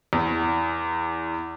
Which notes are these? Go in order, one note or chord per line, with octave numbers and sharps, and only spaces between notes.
E2